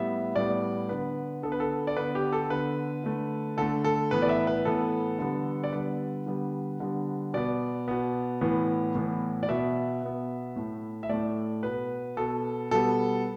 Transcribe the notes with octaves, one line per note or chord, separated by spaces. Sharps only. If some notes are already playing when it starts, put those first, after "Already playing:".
Already playing: A2 G3 B3 E5
A2 G3 B3 D5
D3 B3 B4
D3 B3 A4
B4
A4
D5
D3 B3 B4
G4
A4
D3 B3 B4
D3 A3
D3 A3 A4
A4
A2 E3 B3 B4
D5
E5
B4
A2 E3 B3 A4
D3 G3 B3
D5
D3 G3 B3 B4
D3 G3 B3
D3 G3 B3
B2 B3 D5
B2 B3
A2 E3 B3
A2 E3 B3
D5
B2 B3 E5
B2 B3
A2 A3
E5
A2 A3 D5
B2 B3 B4
B2 B3 A4
B2 G3 B3 A4